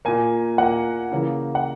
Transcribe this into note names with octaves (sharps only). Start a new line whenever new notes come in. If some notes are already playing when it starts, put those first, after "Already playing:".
A#2 A#3 G#5
A#2 A#3 F#5
C#3 E3 A#3
F#5